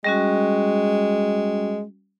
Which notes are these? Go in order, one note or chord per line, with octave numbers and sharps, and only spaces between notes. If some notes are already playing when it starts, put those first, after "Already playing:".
G3 G#3 C#4 F#4